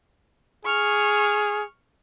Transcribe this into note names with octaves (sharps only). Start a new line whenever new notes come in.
G#4 C#6 F6